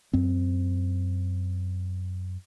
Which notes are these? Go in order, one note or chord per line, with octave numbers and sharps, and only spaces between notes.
F#2 C4